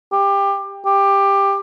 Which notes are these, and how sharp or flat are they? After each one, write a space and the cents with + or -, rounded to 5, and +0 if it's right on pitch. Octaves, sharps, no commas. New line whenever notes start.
G4 +20
G4 +15